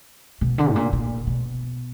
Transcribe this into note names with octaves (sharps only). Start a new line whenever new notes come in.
B2
D3
G#2
A#2
A#2
B2